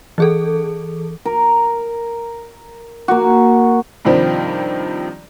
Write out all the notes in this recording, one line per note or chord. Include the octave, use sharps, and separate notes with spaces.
E3 G#4 A4
A#4
A#3 F#4
G2 C3 D#3 F3 G3